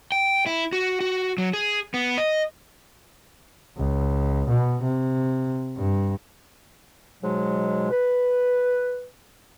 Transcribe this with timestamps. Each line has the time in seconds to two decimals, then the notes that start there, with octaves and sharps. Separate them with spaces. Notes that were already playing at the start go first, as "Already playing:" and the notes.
0.12 G5
0.46 E4
0.73 F#4
1.00 F#4
1.38 F#3
1.54 G#4
1.94 B3
2.18 D#5
3.77 C#2
4.48 B2
4.83 C3
5.78 G2
7.22 G#2 B2 F#3 G#3
7.90 B4